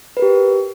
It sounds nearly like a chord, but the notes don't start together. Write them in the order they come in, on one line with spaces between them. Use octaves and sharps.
B4 A#4 G4